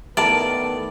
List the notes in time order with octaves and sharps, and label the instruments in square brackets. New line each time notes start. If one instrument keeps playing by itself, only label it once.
[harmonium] D#3 A3 B3 [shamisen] E4 A#4 A5 [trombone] B4 [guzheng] D5